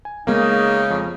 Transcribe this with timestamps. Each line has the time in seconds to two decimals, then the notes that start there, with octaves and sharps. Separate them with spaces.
0.05 G#5
0.27 C#3 G#3 A#3 B3 D#4
0.90 F2